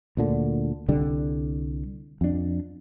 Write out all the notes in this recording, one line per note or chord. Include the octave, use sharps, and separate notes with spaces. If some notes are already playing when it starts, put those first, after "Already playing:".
D2 A#2 D3
C2 D3 G3
F2 D4